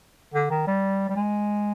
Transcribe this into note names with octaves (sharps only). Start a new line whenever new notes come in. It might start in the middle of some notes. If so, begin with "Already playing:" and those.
D3
D#3
G3
G3
G#3